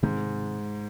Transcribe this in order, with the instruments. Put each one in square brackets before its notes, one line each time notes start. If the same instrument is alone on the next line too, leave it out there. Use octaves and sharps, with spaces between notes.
[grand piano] G#2 [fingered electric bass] C3 D#3 G#3 C4